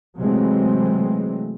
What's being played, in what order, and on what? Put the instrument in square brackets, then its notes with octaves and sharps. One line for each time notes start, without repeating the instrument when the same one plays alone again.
[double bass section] C3 E3 F#3 G#3 A3 C4